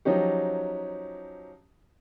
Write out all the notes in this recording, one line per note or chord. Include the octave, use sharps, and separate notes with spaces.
F3 F#3 C#4 D#4 G4